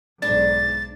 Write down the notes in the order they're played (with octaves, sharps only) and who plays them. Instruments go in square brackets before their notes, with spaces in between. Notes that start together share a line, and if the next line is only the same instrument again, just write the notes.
[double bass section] B1 G#2 [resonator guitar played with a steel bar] D4 [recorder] A6